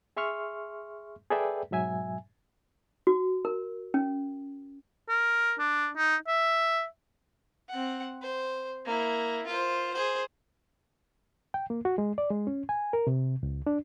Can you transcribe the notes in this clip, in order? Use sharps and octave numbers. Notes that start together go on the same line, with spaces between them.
G#4 E5 C6 C#6 F6
G#4 A4 B4 D5 E5 G5
G#2 B2 F#3 E5 G#5
F#4
A#4
C#4
A#4
D4
D#4
E5
C4 F#5
C5
A#3 E4
F4 C5
G#4 C5
G5
A#3
F#4
G#3
D5
G#3
C#4
G#5
A#4
C3
C#2
D4